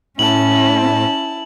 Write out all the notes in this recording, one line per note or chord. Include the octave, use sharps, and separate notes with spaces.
A2 C#4 E4 A5 F#7